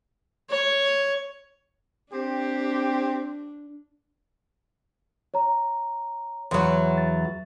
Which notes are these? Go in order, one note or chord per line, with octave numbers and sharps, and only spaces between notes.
C#5
C4 D4 G4
C#5 A#5
E2 F#3 C6
A6